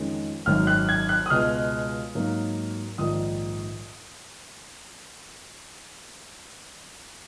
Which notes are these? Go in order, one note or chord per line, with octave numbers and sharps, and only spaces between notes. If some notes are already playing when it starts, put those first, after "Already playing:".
Already playing: F2 D#3 G#3 C#4
G#1 F#2 D#3 F6
F#6
G#6
F#6
D#6
C#2 B2 G#3 F6
G#2 F#3 A#3
A#1 G#2 D#3 D#6